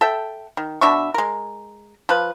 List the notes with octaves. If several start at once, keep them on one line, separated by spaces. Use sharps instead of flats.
A4 E5 G5
D#3
B2 D4 E5 C#6
G#3 A#4
F3 B4